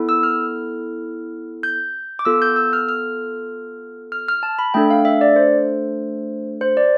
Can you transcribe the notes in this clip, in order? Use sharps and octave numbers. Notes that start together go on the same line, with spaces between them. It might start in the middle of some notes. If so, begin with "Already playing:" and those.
Already playing: B3 E4 A4
E6
F6
G6
D6
B3 F4 A4 E6
G6
E6
F6
F6
F6
F6
A5
B5
A3 D4 A4 G5
F5
E5
D5
C5
C5
D5